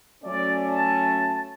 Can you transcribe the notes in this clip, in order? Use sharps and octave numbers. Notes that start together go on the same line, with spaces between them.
F#3 A3 C#4 D5
A5